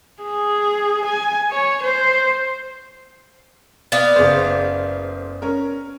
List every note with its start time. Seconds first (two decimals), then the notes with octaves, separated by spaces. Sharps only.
0.23 G#4
1.05 G#5
1.51 C#5
1.83 C5
3.92 B3 D5 F5
4.16 F#1 G#4 C5
5.42 C#4 A#4